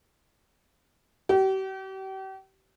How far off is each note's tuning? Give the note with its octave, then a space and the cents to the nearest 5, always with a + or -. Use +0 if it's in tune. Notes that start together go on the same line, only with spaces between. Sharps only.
G4 -40